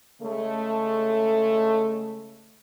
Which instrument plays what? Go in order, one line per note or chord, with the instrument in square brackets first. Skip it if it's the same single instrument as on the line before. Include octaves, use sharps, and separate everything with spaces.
[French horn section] C#3 G#3 A3